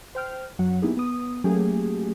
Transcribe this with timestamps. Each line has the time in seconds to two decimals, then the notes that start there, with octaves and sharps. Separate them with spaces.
0.15 C5 G5 F6
0.59 F#2 F#3 F#5
0.82 A#3 B3 D#4 E4 G4 G#4
0.97 B3 D#6
1.44 F#3 A3 A#3 C#4 G4 G#4